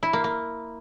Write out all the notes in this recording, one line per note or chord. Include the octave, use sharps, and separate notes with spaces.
E4
A#3
A#3